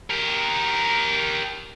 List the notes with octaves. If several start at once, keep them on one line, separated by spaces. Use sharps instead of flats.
G4 A#4